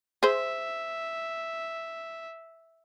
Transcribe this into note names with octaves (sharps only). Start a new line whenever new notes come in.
G#4 C5 E5